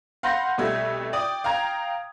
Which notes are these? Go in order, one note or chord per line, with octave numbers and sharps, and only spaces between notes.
F5 F#5 B5 C6 G6 A#6
C2 B2 G3 A3 E5 G#6
D5 G5 D#6
F5 G5 A#5 G#6